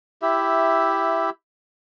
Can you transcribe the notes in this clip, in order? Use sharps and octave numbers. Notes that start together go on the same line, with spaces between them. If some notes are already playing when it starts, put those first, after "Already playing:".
E4 G4 E5